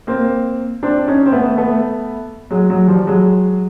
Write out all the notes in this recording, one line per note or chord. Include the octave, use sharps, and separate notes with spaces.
A#3 C4
C4 D4
C#4 D#4
C4
A3 B3
A3 B3
F#3 G#3
F#3 G#3
F3 G3
F#3 G#3